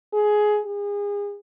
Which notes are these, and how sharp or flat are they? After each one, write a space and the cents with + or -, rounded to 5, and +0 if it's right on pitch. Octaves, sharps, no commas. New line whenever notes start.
G#4 +15
G#4 -30